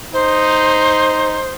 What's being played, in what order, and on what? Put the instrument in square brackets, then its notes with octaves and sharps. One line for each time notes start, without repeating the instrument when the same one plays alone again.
[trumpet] D#4 [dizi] C5